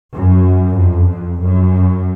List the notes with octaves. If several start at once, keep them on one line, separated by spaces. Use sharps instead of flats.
F#2
F2
F2
F#2